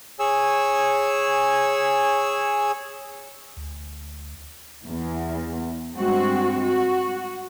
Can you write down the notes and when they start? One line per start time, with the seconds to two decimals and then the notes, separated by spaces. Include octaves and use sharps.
0.19 G#4 C#5 G#5 E6
3.57 D2
4.86 E2
5.95 G2 G#3 C4 F#4
6.62 F#4